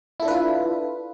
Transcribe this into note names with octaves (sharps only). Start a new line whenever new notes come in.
D4 E4 F4 A4 B4